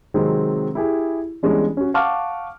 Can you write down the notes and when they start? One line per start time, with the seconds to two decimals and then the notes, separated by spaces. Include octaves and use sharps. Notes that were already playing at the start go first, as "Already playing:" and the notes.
0.14 C3 D#3 F#3 G#3 C4
0.75 E4 G4 G#4
1.43 E3 G3 G#3 B3 C#4 D4
1.77 C#4 F#4
1.94 F5 F#5 A5 C#6 D6 F6